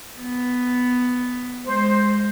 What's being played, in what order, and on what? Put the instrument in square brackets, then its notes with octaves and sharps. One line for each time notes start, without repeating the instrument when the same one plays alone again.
[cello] B3
[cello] G#3 [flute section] C5